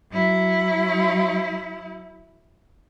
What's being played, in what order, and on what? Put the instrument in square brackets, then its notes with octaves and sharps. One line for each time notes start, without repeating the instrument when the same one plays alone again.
[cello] F#3 E4